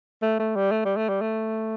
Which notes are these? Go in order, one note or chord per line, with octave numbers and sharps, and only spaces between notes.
A3
A3
G3
A3
G3
A3
G3
A3